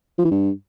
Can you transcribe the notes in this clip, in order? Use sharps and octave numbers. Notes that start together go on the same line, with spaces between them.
F3
E3
G2